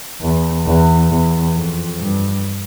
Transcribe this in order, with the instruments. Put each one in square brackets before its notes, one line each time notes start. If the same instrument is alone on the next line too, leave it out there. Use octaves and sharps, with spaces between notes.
[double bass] E2
E2
E2
F2
G2